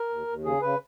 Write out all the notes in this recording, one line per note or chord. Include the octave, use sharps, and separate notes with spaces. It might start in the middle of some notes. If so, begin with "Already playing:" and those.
Already playing: A#4
D#2
D#2
C#3 G#4
C#3 B4